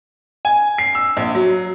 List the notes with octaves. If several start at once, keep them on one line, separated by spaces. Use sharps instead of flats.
G#5
C7
E6
A#1
F#3